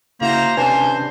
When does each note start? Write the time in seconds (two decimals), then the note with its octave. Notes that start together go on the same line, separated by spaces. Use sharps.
0.21 C#3 A#3 E4 F#4 C5 A#5
0.57 C3 C#4 D4 B4 C5 G#5 A5